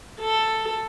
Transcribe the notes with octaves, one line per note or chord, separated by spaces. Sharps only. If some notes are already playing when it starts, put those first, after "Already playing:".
A4